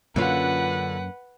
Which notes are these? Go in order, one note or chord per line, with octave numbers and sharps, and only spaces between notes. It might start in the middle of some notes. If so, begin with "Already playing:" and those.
F#2 D3 A#3 C#4 F4 B4 F#5